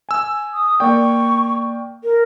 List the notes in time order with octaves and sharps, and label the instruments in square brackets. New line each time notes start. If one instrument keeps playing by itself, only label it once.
[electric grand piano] G#5 E6
[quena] D#6
[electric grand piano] A#3 D5 G5 [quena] C#6
[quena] A#4